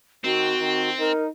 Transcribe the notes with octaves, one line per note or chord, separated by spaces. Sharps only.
D#3 C4 F#4
D#3
D#4 A#4